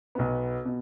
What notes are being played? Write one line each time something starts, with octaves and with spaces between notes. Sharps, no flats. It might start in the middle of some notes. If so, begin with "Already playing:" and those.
B1 B2 B3
B2